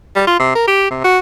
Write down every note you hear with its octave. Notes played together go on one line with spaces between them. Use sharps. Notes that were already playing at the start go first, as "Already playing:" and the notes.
G3
F4
C3
A#4
G4
C3
F#4